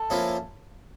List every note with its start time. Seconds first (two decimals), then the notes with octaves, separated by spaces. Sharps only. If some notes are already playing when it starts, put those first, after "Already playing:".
Already playing: A4
0.10 F3 A#3 C#4 E4